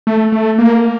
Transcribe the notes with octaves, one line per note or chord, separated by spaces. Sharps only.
A3
A3
A#3